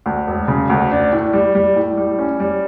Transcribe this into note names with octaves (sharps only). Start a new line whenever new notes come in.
D2
E1
C#3
D2
D4
A2
G3
G3
A2
G3
C#4
G3